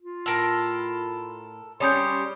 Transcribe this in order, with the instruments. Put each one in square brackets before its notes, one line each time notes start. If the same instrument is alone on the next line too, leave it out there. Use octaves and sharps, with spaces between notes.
[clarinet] F4
[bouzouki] A2 [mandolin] A4 A#4
[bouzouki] G3 C#4 G4 [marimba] C#5 D#6 G6 [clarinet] C6